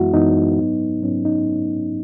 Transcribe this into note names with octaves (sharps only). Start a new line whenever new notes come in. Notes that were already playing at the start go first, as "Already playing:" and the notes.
Already playing: F#2 E3 G#3 B3 E4 F#4
F#2 E3 G#3 B3 D#4
G#2 F#3 B3
G#2 F#3 B3 C#4
D#4